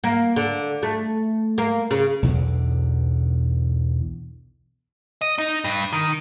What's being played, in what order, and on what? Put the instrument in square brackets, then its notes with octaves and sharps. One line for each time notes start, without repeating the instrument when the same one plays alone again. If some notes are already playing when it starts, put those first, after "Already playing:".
[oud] A#3
D3
A3
A#3
C#3
[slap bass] B1 E2 D3
[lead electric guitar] D#5
D#4
G2
D#3